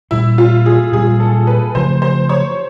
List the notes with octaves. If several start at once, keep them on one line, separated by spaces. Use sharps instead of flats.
A#2 G3 C4 E4
F4
G#4
A#2 G3 C4 G#4
A4
B4
C#3 F3 A3 C4 C5
C5
C#5